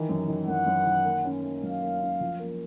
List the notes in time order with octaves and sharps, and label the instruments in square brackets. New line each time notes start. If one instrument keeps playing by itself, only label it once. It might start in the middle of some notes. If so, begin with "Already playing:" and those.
Already playing: [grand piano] D#3 E3
F#2
D#3
[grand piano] F#2 [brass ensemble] F#5
[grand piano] F#2
D#3
A#3
C#4
A#3
[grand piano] F#3 [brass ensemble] F5
[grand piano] A#3
C#4
F3
A#3